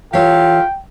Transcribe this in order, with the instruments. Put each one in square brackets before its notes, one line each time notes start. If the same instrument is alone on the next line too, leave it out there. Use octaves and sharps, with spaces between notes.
[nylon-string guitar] E3 C#5 [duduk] F4 [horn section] G4 A4 F5 [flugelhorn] G5